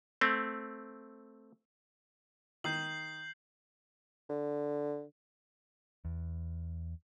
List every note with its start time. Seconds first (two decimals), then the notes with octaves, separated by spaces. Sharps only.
0.21 A3 C4
2.64 D#3 G6 C7 F#7
4.30 D3
6.05 E2